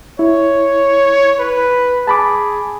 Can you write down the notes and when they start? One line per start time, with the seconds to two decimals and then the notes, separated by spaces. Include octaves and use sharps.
0.19 E4 C#5
1.39 B4
2.07 G#4 A5 B5 D6